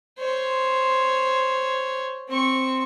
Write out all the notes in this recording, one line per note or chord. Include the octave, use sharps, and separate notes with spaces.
C5 C#5
C4 C#6